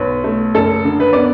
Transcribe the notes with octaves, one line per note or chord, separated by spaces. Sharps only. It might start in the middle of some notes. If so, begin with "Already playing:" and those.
Already playing: B1 B4
A3
F#1 A4
D3
B4
B3 D5